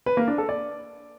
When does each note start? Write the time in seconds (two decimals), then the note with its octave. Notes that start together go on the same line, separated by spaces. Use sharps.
0.06 B4
0.17 A#3
0.28 D4
0.38 A4
0.49 D5